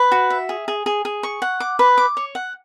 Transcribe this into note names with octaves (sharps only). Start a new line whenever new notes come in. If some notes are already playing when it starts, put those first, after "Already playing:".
Already playing: B4
F#4
E5
G#4
G#4
G#4
G#4
C#6
F#5
D6
B4
D6
C#5
F#5